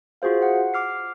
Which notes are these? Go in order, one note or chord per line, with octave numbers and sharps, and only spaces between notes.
F4 F#4 G#4 C5 F5
F#5
D6 F6 C7